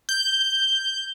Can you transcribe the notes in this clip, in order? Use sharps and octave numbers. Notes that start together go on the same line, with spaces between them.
G6